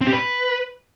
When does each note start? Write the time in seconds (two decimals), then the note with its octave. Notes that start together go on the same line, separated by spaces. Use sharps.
0.01 C4
0.07 G4
0.12 B4